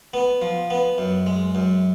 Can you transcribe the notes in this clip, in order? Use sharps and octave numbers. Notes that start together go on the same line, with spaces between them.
B3
F3
B3
F#2
G#3
F#2